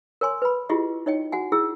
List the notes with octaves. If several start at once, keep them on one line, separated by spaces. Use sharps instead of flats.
A#4 C#5 G#5 C6
B4 B5
E4 F4 G4 G#4 D#5
D#4 C#5 D#5 G5
F#4 F#5 G#5
E4 G#4 E6